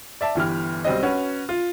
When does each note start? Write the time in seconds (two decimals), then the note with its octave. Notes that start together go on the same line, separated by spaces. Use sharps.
0.21 D5 E5 A5
0.35 G1 E3 G4 F6
0.85 B1 G3 C4 D#5
1.03 C#4 F#4 B4
1.49 F4